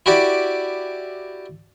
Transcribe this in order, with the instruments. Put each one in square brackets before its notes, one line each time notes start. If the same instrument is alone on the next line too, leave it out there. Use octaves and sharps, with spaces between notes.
[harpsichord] E4 F#4 G4 D5